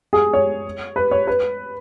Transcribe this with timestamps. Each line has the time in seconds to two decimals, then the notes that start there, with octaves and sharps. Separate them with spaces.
0.13 G#4
0.33 C#5
0.96 B4
1.11 C#5
1.27 B4